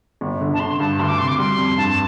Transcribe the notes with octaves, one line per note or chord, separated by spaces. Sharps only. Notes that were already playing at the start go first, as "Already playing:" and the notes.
G1
D3
A5
D3 C6
G2 A5
D2 C6
D6
C3 C6
D6
G3 C6
F2
G2 A5